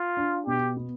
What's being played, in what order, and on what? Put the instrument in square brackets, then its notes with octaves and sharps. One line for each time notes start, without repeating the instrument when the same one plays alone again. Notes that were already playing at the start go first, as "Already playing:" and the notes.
Already playing: [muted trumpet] F4
[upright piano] D4
[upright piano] B2 [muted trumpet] G4
[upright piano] B3